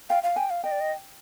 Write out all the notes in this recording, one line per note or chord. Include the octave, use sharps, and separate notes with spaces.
F5 G5
F5
G5 G#5
F5
D#5 G5
D5
D#5